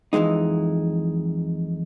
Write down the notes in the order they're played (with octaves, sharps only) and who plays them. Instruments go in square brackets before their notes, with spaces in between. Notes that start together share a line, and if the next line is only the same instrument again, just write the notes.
[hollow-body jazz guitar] F2 E3 F#3 G#3 D#4